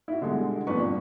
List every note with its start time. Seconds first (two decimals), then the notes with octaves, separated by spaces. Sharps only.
0.08 E4 F#4
0.21 B2 D3 G3 G#3
0.67 F2 A#2 D4 B4 C#6
0.80 G2